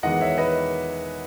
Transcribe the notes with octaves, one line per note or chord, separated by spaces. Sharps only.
E2 D#3 G#3 B3 D#5 F#5
C#5 E5
B4 D#5